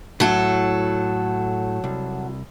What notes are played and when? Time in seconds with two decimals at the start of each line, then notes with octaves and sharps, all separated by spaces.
0.20 A2 F#3 E4 A4
1.84 C2